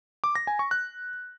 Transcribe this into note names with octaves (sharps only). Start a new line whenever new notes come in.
D6
A#6
G#5
C#6
F#6